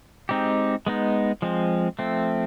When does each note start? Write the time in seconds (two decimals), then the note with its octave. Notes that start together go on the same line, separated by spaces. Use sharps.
0.29 G#3 C4 D#4 G4
0.86 G#3 B3 D#4
1.42 F3 G#3 C4
1.99 F3 A3 C4